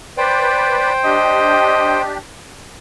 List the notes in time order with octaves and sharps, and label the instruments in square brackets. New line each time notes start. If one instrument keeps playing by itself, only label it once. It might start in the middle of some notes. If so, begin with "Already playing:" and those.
[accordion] B4 D5 [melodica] C5 G5
[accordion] D4 G4 [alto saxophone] D#5